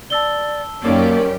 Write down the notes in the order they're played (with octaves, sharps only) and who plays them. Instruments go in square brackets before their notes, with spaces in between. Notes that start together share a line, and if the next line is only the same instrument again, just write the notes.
[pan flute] D5 [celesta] A5 E6 G7
[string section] F#2 G4 [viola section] D#3 C#4 D5 [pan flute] A#3